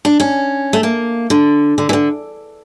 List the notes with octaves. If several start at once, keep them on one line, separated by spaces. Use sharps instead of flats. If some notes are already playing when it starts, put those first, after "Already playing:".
D4
C#4
A3
A#3
D3
D3
E3
D3